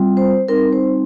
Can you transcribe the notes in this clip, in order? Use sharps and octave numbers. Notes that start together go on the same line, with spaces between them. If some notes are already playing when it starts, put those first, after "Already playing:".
Already playing: G3 C4 F4
C5
G3 C4 D#4 A#4
C5